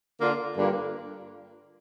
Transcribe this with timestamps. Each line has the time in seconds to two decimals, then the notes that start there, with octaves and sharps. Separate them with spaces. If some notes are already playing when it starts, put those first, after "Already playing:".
0.19 D3 A#3 D4 F4
0.57 G2 D3 A#3 F4